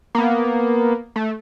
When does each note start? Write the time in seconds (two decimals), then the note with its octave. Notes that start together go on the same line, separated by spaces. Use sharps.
0.15 A#3 B3
1.16 A3